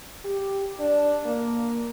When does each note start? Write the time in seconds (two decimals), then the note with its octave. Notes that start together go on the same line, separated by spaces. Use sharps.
0.25 G4
0.79 D4
1.26 A#3